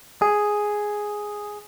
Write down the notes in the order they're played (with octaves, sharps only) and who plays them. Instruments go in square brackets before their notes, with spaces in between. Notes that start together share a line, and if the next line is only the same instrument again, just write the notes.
[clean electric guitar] G#4